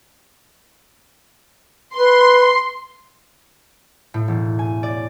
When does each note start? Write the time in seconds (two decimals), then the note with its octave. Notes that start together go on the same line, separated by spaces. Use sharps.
1.96 B4 C6
4.14 A2
4.28 E1
4.59 G#5
4.83 D5